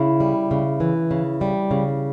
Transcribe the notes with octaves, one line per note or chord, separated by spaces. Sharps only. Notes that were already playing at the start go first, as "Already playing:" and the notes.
Already playing: C#3 E4
G3
C#3
E3
C#3
G3
C#3